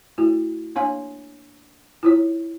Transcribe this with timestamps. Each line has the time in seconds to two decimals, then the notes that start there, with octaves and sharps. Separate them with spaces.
0.18 A3 E4 F#4
0.76 A#3 D4 C#5 F5 G#5
2.03 E4 F4 C#5